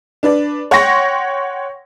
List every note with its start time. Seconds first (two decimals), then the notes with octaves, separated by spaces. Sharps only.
0.23 D4 B4 D5
0.71 C#5 F#5 G5 C6 C#6 A#6